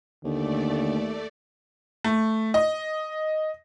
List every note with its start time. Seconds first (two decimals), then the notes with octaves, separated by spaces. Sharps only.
0.24 D#2 D3 A3 D5
2.04 A3
2.54 D#5